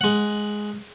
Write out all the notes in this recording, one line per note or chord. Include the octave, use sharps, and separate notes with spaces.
G#3 F#5